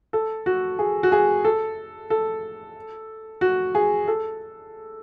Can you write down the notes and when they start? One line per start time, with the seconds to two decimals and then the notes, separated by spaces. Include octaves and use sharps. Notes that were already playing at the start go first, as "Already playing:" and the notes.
0.13 A4
0.46 F#4
0.79 G#4
1.03 F#4
1.12 G#4
1.45 A4
2.10 A4
3.41 F#4
3.75 G#4
4.08 A4